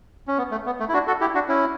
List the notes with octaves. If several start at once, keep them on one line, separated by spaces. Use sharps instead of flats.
C#4
B3
A3
B3
A3
E4
D4 F#4
F#4 A4
E4 G4
D4 F#4
C#4 E4